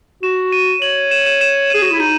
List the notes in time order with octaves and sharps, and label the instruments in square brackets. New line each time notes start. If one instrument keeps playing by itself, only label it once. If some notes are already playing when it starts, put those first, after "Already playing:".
[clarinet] F#4 [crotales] E7
[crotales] D#7
[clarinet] C#5 [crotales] F#7
[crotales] E7
E7
E7
[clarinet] G#4 [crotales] D#7
[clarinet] F#4 [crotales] E7
[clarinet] E4
[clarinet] D#4 [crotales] D#7